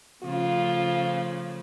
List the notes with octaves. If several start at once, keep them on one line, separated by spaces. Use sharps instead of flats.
C#3 F3 A3 F4